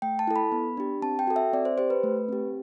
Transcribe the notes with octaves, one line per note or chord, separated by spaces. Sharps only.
A3 G5
A5
E4 A4
B5
B3
D4 G4
C4 A5
G5
F#4 A4
E5
C4 D5
C5
G4 C5
B4
A3
C4 G4